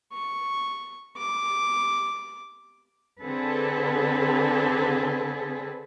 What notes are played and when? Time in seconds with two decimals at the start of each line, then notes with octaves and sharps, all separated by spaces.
0.13 C#6
1.17 D6
3.23 D3 C4 G#4 A4 B4